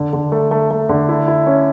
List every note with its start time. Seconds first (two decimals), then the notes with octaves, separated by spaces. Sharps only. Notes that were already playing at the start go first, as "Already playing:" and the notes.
Already playing: D3
0.13 D3
0.32 A3
0.51 A3
0.71 A3
0.89 D3
1.09 E4
1.28 E4
1.47 C#4